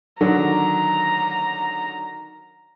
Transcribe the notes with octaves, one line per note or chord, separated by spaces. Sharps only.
D3 D#3 F#3 A#5